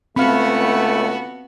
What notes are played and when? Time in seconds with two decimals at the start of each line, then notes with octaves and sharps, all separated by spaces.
0.16 C#2 A3 B3 C4 F#4 F5 B5